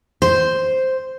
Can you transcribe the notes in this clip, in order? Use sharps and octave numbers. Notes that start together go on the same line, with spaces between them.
C5